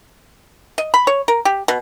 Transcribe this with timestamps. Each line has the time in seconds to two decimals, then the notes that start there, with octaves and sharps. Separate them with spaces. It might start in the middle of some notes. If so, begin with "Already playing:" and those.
0.78 D#5
0.94 B5
1.07 C#5
1.28 A#4
1.45 G4
1.68 B2